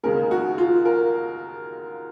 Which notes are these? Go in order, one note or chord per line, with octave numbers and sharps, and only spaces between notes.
D#2 C#3 G#3 A#4
F#4
F4
A#4